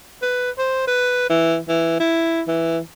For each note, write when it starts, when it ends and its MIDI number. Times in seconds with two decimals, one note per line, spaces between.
0.22 0.50 71
0.58 0.86 72
0.87 1.25 71
1.29 1.58 52
1.68 1.95 52
1.99 2.42 64
2.47 2.79 52